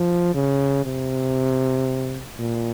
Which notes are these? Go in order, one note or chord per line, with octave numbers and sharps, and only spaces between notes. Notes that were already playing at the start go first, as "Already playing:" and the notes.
Already playing: F3
C#3
C3
A#2